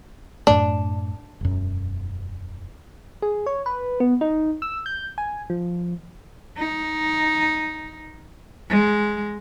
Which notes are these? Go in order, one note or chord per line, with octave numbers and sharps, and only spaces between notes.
F#2 A2 A3 D4
E1 F#2
G#4
C#5
B4
B3
D#4
E6
G6
G#5
F3
D#4
G#3